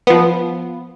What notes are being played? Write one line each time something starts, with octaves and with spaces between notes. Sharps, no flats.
F3 B3